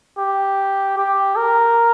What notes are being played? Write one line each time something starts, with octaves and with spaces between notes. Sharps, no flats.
G4
G4
A#4